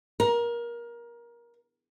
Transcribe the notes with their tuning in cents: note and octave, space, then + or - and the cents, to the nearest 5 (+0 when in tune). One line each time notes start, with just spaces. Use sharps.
A#4 +20